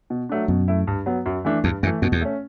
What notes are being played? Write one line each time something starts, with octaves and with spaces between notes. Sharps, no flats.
B2
F#3 A3 D4
F#2 B2
A3 E4
G2
F#3 B3
F#2
E3 A3 D4
E2 G2
F#2 E3 A3
F#2 B2
E2
A3 C#4